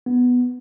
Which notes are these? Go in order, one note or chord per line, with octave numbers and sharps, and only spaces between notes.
B3